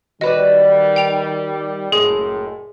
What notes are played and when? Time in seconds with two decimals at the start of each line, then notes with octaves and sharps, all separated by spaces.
0.21 D#3 G3 F#4 B4 D5 D#5
0.96 G5 D7 F7
1.92 F#1 A2 G#3 G#4